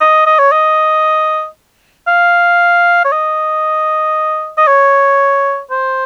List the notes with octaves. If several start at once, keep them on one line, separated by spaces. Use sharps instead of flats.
D#5
D#5
C#5
D#5
F5
C#5
D#5
D#5
C#5
C5